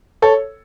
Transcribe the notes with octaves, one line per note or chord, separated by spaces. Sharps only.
A4 C#5